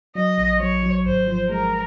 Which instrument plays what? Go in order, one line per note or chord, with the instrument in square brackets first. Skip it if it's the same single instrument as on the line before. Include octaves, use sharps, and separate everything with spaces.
[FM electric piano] F#3 [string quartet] D#5
[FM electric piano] A#1
[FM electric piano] F#3 [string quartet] C#5
[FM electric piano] F#3
[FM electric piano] G#1 [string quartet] C5
[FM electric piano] F3
[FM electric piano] G#3 [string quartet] A#4